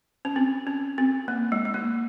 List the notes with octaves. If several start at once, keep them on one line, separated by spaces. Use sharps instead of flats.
C#4
C4
C#4
C4
A#3
G#3
G#3
A#3